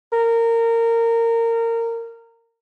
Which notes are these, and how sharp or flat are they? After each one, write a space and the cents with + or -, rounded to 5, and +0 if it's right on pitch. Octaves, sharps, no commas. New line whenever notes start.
A#4 -20